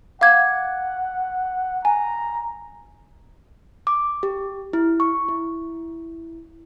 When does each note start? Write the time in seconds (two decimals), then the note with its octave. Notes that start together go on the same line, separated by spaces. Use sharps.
0.21 F5 F#5 D6 G#6
1.85 G#5 A#5
3.87 D6
4.23 G4
4.73 E4
5.00 C#6
5.28 E4